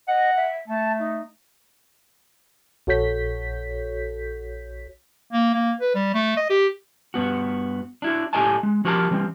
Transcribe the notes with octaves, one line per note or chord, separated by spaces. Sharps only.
D#5 F#5
E5
A3 A5
D#4
A#1 F#4 A4 C#5 G6 B6
A#3
A#3
B4
G3
A3
D#5
G4
G2 B3 F#4
D4 E4 F#4
A2 G4 A4 D#5 G#5 A5
G#3
F3 F#4 G4 A#4 G5 A5
E3 G3 C4